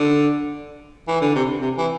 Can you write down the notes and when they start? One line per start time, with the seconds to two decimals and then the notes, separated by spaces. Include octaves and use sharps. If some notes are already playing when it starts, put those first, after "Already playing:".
Already playing: D3
1.08 E3
1.21 D3
1.35 C3
1.61 C3
1.78 E3